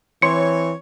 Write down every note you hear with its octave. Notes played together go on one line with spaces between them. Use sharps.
E3 C4 C#5 C6 C#7